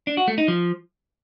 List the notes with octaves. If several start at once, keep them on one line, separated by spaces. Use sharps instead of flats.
D4
F#4
A3
D#4
F3